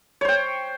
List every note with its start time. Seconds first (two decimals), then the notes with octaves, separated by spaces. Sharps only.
0.21 C#5
0.25 C5
0.28 G5